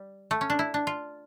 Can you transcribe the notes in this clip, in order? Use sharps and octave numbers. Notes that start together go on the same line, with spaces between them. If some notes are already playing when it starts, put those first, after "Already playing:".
Already playing: G3
A3
C#4
D4
E4
D4
F4